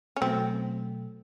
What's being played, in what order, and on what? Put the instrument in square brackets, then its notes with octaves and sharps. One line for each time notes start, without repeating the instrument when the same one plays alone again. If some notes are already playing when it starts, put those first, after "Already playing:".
[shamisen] C#4
[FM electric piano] B2 F#3 A3 [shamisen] C4